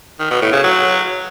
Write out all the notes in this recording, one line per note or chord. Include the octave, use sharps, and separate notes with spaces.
D#3
B2
A2
C#3
F#3